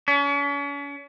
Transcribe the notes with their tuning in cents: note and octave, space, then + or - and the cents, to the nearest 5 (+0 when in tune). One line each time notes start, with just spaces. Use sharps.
C#4 +40